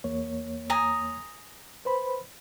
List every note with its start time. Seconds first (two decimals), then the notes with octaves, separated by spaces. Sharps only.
0.04 E2 A#3 C#5
0.70 G#5 A#5 D#6
1.85 B4 C5 B5